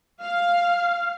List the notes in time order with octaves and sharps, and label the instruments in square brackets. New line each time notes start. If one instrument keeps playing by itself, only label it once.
[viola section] F5